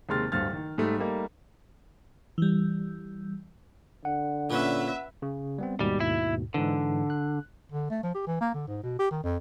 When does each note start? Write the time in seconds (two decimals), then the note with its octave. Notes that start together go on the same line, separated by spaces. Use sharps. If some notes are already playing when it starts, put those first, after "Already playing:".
0.09 D#2 C3 G#3 C6 F6 A6
0.32 D1 G2 C5 F6 A6
0.53 D#3
0.78 G#2 G3 A3
0.98 G3 A3 A#3 D#4
2.38 E3 G3
4.05 D3 F#5
4.50 A#2 C#4 B4 E5
5.22 C#3
5.58 G3 B3 C4
5.80 D#2 G#2 B2 G3
6.00 E4
6.54 G#2 D3 E3
7.10 F#6
7.72 D3
7.91 A3
8.03 F3
8.15 G4
8.27 E3
8.41 A#3
8.54 D3
8.68 G#2
8.84 B2
8.99 G4
9.11 D#3
9.24 F2